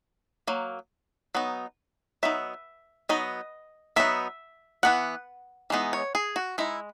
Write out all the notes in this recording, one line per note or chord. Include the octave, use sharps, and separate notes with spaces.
F#3 A#3
F#3 B3 D#4
F#3 B3 D#4 E5
F#3 B3 D#4 D#5
F#3 B3 D#4 E5
E3 B3 D#4 F#5
E3 G#3 B3 D#4
C#5
G#4
F#4
G#3 D#4 E4